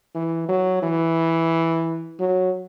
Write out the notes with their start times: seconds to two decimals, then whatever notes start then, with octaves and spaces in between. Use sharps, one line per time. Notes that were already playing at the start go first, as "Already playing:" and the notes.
0.15 E3
0.48 F#3
0.82 E3
2.20 F#3